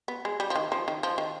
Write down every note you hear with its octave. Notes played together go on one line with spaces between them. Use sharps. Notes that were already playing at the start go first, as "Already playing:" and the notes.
B3
G#3
G3
F3
D#3
F3
D#3
F3
D#3